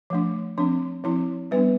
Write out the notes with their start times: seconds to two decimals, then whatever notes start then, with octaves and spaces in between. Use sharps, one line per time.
0.10 F3 A3 D4
0.58 F3 C4 D4
1.04 F3 C4 E4
1.51 G3 B3 D4 B4